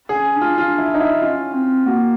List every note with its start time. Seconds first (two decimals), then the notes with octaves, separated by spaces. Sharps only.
0.09 G#4
0.14 C#4
0.36 D4
0.41 F4
0.57 D4 F4
0.78 E4
0.94 D#4
1.00 E4
1.21 C#4 F4
1.53 C4
1.86 A#3 F#4